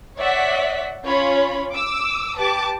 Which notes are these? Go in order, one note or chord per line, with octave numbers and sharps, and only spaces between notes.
C#5 D5 E5 F#5 B6
C#4 F4 C#5 B5
D6 E6
G4 B4 A5 D6